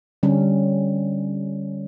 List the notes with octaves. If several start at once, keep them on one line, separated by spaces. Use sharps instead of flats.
D3 G3 C#4